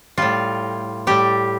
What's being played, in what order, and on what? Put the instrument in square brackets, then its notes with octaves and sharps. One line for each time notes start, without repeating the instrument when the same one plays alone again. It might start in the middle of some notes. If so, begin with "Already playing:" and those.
[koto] A2 G3 F4
A2 G3 G4